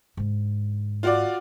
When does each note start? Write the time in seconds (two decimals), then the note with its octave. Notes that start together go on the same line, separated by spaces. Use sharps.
0.17 G#2 D3
1.03 F4 F#4 D5